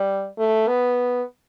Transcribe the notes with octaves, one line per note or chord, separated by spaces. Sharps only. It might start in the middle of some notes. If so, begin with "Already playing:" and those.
Already playing: G3
A3
B3